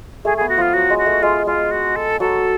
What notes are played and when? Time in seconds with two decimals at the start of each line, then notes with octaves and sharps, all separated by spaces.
0.25 A3 G#4
0.37 B3 G#4
0.49 F#4
0.58 F3 F4
0.74 F#3 F#4
0.90 G#3
0.98 F#4
1.06 A3
1.23 G#3 F4
1.47 G#3 F4
1.71 F#4
1.96 A4
2.20 F#3 A4